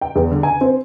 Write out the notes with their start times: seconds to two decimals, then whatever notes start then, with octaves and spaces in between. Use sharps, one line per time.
0.01 G5
0.15 E2
0.32 D3
0.43 G#5
0.61 C4